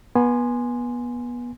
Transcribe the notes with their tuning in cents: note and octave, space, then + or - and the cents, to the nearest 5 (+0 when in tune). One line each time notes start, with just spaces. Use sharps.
B3 -25 G#5 +0 C6 +0